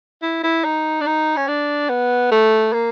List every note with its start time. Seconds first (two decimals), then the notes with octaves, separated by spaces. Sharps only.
0.22 E4
0.44 E4
0.64 D#4
1.01 D4
1.06 D#4
1.37 C#4
1.48 D4
1.89 B3
2.31 A3
2.73 A#3